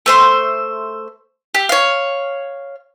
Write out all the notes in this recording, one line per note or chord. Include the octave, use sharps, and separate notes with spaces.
A3 C5 C6
G4
C#5 F5